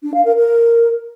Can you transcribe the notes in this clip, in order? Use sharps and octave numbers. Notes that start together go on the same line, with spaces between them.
D4
F5
A#4
A#4